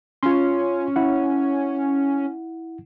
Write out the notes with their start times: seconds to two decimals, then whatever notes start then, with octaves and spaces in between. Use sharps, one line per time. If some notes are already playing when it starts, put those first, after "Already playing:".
0.23 C#4 F4 C6
0.96 E4 F#5